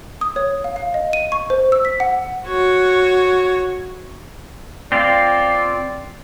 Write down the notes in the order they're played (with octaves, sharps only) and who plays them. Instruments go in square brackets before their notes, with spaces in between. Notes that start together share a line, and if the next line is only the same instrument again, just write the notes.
[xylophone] D#6
C#5
F5
F5
D#5
D#7
C#6
C5
E6
B6
F#5
[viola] F#4 C#5
[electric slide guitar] C4 F4 [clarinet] D5